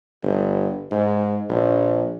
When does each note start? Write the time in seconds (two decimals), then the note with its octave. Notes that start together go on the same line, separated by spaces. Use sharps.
0.23 G1
0.91 G#2
1.49 A#1